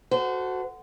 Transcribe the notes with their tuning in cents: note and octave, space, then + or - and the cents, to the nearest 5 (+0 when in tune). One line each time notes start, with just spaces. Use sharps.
F#4 +0 A4 +0 C5 -30